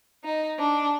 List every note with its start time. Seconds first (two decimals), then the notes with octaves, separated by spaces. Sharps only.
0.24 D#4
0.59 D4